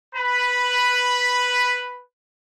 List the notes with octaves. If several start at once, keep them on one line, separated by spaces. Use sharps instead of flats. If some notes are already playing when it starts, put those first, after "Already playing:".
B4 B5